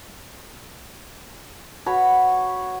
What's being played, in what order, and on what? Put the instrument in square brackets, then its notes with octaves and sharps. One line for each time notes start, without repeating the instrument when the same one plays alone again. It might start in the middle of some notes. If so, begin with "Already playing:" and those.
[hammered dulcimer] F#4 B4 C#5 B5